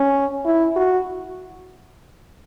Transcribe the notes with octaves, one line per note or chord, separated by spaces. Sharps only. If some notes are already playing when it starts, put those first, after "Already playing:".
Already playing: C#4
E4
F#4